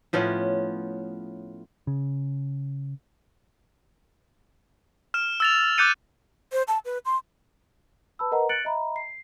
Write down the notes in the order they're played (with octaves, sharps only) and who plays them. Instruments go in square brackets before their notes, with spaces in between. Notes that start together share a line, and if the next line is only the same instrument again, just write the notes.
[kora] A2 F3 B3 C#4
[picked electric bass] C#3
[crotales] F6 E7
E6 A6 F7
D6 F#6 G6 A6 C#7 D#7
[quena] C5
A5
B4
C6
[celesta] B4 A5 B5 E6
A#4 B4 D#5 F#5 A#5
F#6 A6 C#7 D7 F#7
D#5 E5 A#5 B5
C7